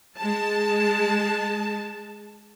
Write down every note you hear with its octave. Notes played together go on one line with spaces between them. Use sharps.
G#3 A5